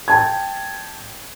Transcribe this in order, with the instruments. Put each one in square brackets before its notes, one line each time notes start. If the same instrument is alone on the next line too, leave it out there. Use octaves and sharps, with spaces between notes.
[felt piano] G5 A5 G#6